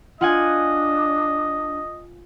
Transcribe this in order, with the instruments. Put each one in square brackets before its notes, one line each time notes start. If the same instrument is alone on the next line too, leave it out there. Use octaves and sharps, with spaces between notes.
[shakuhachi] D4 [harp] F4 F#5 G#5 [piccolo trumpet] D#5